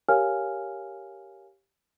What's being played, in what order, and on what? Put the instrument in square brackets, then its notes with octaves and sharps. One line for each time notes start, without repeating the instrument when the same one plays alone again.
[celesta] G4 A#4 C#5 F5 G#5 F6